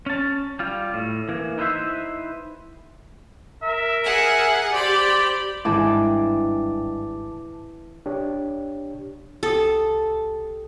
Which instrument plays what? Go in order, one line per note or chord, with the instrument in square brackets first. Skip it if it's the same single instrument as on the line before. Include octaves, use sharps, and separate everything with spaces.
[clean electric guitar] C#4 A5
G3 F4
A2
E3 A#3
D#4 E4 B4 C5 E5
[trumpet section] A#4 E5
[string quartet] G#4 F#5 G#5
[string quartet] G4 B5 [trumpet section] C5 D5
[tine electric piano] G#1 A5 D6 [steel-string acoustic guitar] G2 G#3 G5 [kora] E3
[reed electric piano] D4 G4 C#5
[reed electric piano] C2 G4 D#6 [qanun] A4